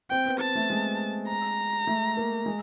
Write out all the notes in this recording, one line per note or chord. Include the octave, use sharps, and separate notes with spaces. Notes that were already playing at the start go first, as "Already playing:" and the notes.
C4 G5
B3
A5
A3
G#3
A#5
A3
A#3
G#3